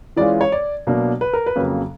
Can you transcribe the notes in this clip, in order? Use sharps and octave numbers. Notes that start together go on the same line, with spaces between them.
E3 G#3 C#4 F4 D5
C#5
D5
B2 F#3 A#3 D4
B4
A#4
B4
F2 C#3 F#3 A#3 C#4